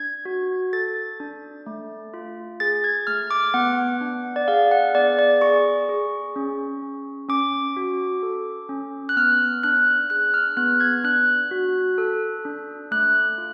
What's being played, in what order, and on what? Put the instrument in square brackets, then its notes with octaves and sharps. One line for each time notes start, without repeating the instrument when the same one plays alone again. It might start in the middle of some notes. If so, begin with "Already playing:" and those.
Already playing: [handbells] D4 G#6
F#4
A4 A6
D4
A3
F4
G#4 A6
G#6
A3 F6
D6
B3 F#5
D4
D5
G#4 F5
F#5
B3 D5
D5
G#4 C#6
G#4
C#4
C#4
C#4 D6
F#4
A4
C#4
F#6
B3 F6
D4 F#6
G#4 F#6
F6
B3 F#6
G#6
D4 F#6
F#4
A4
D4
A3 F#6
F4